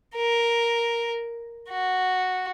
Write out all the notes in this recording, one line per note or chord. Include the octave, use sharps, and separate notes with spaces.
A#4
F#4